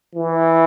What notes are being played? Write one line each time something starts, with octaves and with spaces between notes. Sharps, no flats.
E3